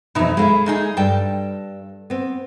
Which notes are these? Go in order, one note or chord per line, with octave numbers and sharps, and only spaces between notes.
F2 B2 E3 D#4 E5
G#3 E4 A4 E5 F5
A#2 D#4 G#4
G2 G3 A4 G5
B3 C4